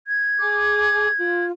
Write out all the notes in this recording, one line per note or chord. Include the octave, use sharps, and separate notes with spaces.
G#6
G#4 D6
F4